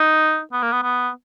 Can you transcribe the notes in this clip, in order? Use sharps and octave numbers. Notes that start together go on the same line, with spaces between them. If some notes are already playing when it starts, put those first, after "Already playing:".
Already playing: D#4
B3
A#3
B3
B3